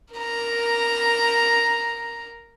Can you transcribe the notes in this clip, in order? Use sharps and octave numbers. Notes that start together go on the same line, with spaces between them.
A#4 A#5